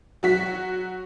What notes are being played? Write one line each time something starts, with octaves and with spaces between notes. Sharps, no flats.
F#3 F#4 B6